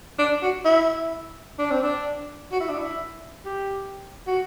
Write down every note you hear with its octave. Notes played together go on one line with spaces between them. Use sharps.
D4
F#4
E4
D4
C4
D4
F#4
E4
D4
E4
G4
F#4